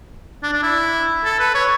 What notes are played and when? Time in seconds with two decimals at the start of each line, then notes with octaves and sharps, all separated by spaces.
0.43 D4
0.53 D4
0.63 E4
1.24 A4
1.39 B4
1.54 C#5